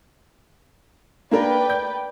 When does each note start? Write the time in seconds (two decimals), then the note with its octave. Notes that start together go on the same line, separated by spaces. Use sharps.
1.31 A#3 D4 A#4 B4 D5 G5
1.69 G6